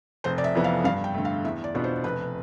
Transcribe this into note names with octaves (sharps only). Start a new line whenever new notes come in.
F1 C5
D5
E5
F2 E3 B3
F5
G2 F5
G5
D3 A3
F5
E2 E5
D5
B2 B3 D4 F4
C5
F1 B4